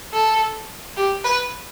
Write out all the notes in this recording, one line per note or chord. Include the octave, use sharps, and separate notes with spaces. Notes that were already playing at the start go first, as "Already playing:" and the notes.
A4
G4
B4